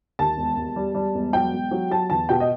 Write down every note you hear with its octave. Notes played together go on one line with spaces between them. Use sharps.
D#2 A5
E1
E1
G3
G3
E1
F#3 G5
E1
F#3
F#3 A5
E2 A5
B2 G5
D#5